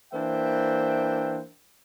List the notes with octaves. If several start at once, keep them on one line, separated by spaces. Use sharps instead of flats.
E3 A#3 D4 C5 E5 G5